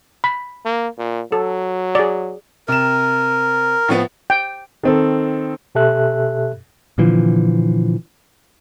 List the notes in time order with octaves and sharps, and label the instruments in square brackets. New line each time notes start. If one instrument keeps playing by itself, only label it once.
[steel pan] B5
[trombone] A#3
A#2
[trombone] F#3 [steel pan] A4
[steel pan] G#4 D5
[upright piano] C3 E7 [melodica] A#4
[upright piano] A2 F3 B3
[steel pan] G5
[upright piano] D#3 C4 A4
[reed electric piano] B2 G4 A4 E5 F#6
[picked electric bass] A#2 D3 E3 F3